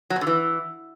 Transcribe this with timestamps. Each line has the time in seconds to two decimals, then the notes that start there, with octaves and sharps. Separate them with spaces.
0.10 F#3
0.16 B2
0.21 D3
0.27 E3